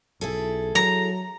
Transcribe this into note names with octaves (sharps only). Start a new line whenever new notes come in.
B1 E4 G#4 A4
F#3 A#5